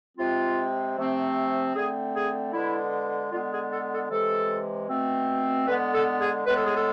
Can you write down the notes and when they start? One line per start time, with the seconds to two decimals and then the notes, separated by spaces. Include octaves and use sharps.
0.18 C3 G#3 C4 F4
0.97 C3 F3 A3 C4
1.75 D3 A3 C4 G#4
2.15 G#4
2.53 D3 G#3 B3 E4
3.32 D3 G#3 B3 F4
3.52 G#4
3.72 A4
3.91 A4
4.10 C3 E3 G#3 A4
4.89 B2 A3 C4
5.67 D3 G#3 B3 B4
5.94 A4
6.20 G#4
6.46 A2 G#3 B3 B4
6.55 A4
6.64 G#4
6.74 A4